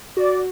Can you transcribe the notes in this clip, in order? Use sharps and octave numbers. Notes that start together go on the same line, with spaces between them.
F#4 D5